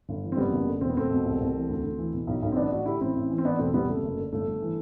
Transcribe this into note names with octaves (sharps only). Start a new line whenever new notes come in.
G1
E3
C4
F#1 G3 B3
F#1
D3
E1 C4
B3
E1 A3 C4
B2
C2
C2
E3
D2
D2
E3
B2
B1
B1
C4
A1 B3 D4
A1 D4 F#4
D3 E4 G4
A1 C4 E4
A1
E3
C4
E3 B3 D4
E1 A3 C4
C3 G3 B3
F#1 A3
F#1
D3
G1 A3
G1
E3